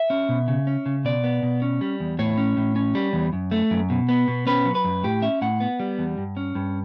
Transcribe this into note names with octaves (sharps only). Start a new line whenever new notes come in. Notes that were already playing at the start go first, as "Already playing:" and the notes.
Already playing: E5
C#4
B2
C#3
C#4
C#3
B2 D5
B3
B2
C#4
G3
E2
A2 C#5
C#4
A2
C#4
G3
E2
F#2
A3
F#2
B2
B3
B2
C#4 B4
F#3
B4
F#2
A2 G4
C#4 E5
A2 F#5
B3
G3
E2
G2
C#4
G2